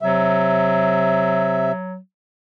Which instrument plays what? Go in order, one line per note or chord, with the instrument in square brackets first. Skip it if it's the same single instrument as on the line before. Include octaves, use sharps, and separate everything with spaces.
[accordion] C3 E5 [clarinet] F#3